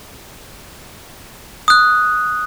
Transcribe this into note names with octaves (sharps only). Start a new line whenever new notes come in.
D#6 F#6